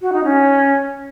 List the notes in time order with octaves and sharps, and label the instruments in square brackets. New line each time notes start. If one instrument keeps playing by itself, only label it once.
[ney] F#4
D#4
C#4